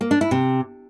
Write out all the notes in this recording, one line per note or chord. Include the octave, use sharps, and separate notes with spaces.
A#3
D4
E4
C3